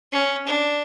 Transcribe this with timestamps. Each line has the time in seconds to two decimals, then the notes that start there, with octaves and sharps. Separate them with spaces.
0.12 C#4
0.47 D4